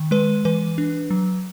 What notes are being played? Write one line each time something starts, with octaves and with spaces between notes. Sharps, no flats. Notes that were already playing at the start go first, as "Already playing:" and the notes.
Already playing: D#3
G#3 B4
E3 B4
D4
F#3